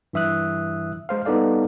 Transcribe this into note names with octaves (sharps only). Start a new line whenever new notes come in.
G2 E3 E5 D#6 F#6
G#3 C5 F5
G3 B3 D#4 A4 D5 F5